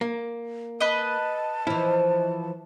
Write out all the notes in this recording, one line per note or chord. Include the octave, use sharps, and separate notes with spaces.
A#3
B4 D#5 A5
E3 F3 E4